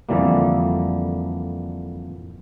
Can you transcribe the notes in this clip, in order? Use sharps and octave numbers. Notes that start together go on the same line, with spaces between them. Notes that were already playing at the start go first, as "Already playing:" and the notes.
F2 D3 E3 G3 A#3